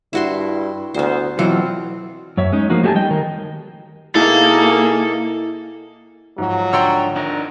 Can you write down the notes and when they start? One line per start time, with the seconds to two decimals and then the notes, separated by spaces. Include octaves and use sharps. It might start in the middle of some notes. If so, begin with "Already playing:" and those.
0.13 G2 E4 F#4 C6
0.94 D2 B3 C5
1.39 B2 E3 F#3 C4 F4
2.37 F#2 C#5 E5
2.52 G#3 C#4 D#4
2.70 F3 A#3 D#4 F#4
2.83 F#3 A3 G4 E5 G#5 A5
2.95 G3 D#5 G5
3.11 D#3 A#4
4.15 B2 A#3 D#4 E4 G#4 A4
6.38 G#2 F3 F#3
6.73 D3 C#5 D5 G5 C6 E6
7.16 G#1 D4 D#4 A#4